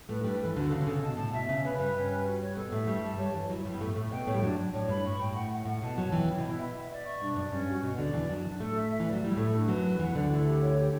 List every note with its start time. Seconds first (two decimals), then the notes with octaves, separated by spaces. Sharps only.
0.09 A2 A3 B4
0.24 G2 G3 B4
0.41 E3 A4
0.56 D2 D3 F#4
0.71 C#3 A4
0.81 D3
0.86 C#3 A4
1.02 B2 A5
1.17 A2 A5
1.33 B2 E5
1.48 C#3 C#4
1.64 C#3 B4
1.79 G2 G3 B4
1.95 C#4
2.10 B4
2.26 F#4
2.41 C#5
2.57 B2 B3 A4
2.72 A2 A3 E5
2.87 G2 G3 C#6
3.03 A5
3.18 G2 G3 C#5
3.33 E2 E3 C#5
3.49 F#2 F#3 E4
3.65 G2 G3 E4
3.74 B3
3.80 A2 A3 C#6
3.95 A2 A3 C#6
4.11 B2 B3 G5
4.27 A2 A3 C#5
4.34 G3
4.42 F#2 F#3 D4
4.58 D4
4.73 A2 C#5
4.88 G2 B5
5.05 A2 C#6
5.19 A2 G5
5.36 F#5
5.50 F#5
5.65 A2 F#5
5.82 B2 A5
5.97 F#2 F#3 C#5
6.12 E2 E3 G5
6.28 C#3 E4
6.38 B2
6.43 E4
6.49 B2
6.59 E5
6.75 E5
6.90 D5
7.05 C#6
7.20 G2 D4
7.36 F#2 D5
7.52 G2 C#4
7.67 G2 F#4
7.83 B2 F#4
7.98 D2 D3 D5
8.13 E2 E3 D4
8.29 F#2 F#3 D4
8.44 D4
8.60 A2 A3 A4
8.76 E5
8.91 E5
9.00 E3
9.06 D5
9.13 F#3
9.22 G3 E4
9.37 A2 A3 A4
9.53 D4
9.68 F#2 F#3 B4
9.83 B4
9.99 E2 E3 F#5
10.14 D2 D3 D5
10.30 E4
10.46 G4
10.62 C#5
10.77 G4